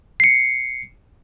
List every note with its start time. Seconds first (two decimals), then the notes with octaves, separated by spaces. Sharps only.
0.20 C7 C#7